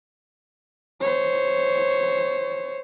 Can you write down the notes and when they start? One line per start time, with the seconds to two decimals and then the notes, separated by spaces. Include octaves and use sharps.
1.01 C5 C#5